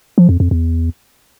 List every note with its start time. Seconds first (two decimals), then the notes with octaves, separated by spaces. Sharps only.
0.18 F3
0.29 F2
0.40 F2
0.51 E2